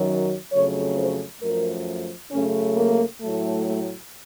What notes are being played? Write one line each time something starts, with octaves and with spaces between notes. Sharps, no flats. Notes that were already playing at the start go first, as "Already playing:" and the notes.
Already playing: F#2 D#3 F#3
F2 C#3 F#3 A3 C#5
C5
F#2 F3 A3 A#4
F#2 C#3 A3 C#4
A#3
A2 F#3 A3
A3